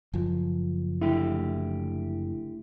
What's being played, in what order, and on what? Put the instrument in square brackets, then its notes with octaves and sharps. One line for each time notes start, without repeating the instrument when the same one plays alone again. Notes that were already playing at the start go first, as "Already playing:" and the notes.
[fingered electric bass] F#1 F3
[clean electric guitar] D3 A3 G4 [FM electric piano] E4